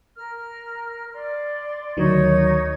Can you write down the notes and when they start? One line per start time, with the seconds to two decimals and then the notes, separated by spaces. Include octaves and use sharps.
0.15 A#4 F6
1.13 D5 C6
1.97 D2 D#3 F#3 D#4 C#5 G#6